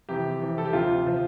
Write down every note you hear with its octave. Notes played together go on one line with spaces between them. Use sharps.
F2 C3 E3 G4
F2 C3 E3
A4
G4
D2 C3 F3 F4
C3 F3